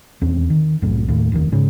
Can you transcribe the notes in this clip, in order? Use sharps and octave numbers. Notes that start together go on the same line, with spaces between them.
D#1 E2 C4 C#4
D#3
F1 C2 F#2 A2
D#2 A2
F1 D#2 C3 D#3
G#2 C#3